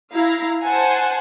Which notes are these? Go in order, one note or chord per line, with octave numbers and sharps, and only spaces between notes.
E4 F5 A#5
C5 F#5 G#5 A5